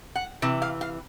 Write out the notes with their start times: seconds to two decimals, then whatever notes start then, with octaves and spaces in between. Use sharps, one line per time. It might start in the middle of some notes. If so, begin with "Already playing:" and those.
0.15 F#5
0.42 C3 E3
0.62 F5
0.81 F5